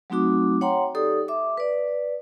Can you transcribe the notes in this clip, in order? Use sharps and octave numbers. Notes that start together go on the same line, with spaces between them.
F#3 A3 C4 D#4 F#4 D6
C#5 F#5 G5 A#5 C6
D#4 G4 A4 D5 D#6
E5 D6
B4 D5